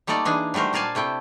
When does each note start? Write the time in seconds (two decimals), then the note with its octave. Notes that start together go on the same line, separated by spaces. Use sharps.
0.07 G3 A3 A#3 D#4 A4 D5
0.25 E3 D4 D#4 G#4
0.54 F#3 G3 A3 A#4 C5
0.73 A#2 A#4 D5 F5 G#5 A5
0.95 C3 A3 E4 G5